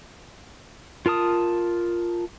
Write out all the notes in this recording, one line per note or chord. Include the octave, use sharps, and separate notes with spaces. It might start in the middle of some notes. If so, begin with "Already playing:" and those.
F4 A#4 A5 D#6